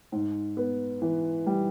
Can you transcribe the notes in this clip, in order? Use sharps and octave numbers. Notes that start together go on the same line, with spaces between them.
G#2
B3
E3
G3